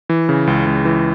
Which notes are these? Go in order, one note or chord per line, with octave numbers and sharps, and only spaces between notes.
E3
C#3
C#2
C#2
E3